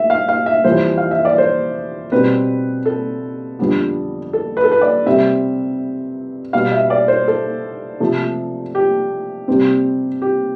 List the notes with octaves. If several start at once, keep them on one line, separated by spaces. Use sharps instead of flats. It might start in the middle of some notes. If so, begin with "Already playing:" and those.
Already playing: A3 E5
F5
F5
E5
F2 E3 G3 C5
F5
E5
D5
C5
B2 G3 C4 B4
A4
F2 D3 G3 B3
A4
B4
A4
B4
D5
C3 G3 C4 E5
B2 G3 B3 F5
E5
D5
C5
A4
C3 F3 A3
G4
C3 G3 C4
G4